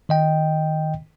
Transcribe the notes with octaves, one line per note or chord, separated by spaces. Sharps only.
D#3 D#5 G5